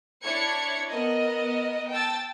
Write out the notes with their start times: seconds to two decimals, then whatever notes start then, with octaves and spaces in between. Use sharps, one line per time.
0.24 D4 E4 C#5 G#6 C#7
0.89 B3 A#4 D#5
1.91 G5 A5 E6 A6